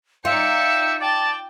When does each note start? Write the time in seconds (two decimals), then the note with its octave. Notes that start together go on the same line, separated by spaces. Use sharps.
0.25 D#4 F4 D5 E5 G5 C#7
1.01 D5 G5 A5